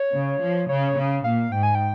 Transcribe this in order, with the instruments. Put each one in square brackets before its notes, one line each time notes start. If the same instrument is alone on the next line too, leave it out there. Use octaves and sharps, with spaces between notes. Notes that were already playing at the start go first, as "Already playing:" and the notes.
Already playing: [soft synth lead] C#5
[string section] C#3
F3
[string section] C#3 [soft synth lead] C#5
[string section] C#3
[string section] A#2 [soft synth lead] F5
[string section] G#2 [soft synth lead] G5
[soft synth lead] G#5
G5